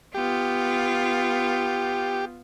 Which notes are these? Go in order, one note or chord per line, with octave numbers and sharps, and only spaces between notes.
B3 F4 G4